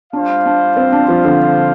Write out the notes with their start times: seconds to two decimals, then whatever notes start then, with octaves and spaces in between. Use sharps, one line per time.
0.13 G3 D4 F4 C5 F5
0.46 D4
0.76 C4
0.92 D4
1.08 F3
1.25 D3